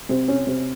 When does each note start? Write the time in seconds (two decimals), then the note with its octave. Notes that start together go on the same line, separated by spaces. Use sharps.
0.09 C3
0.28 C#4
0.47 C3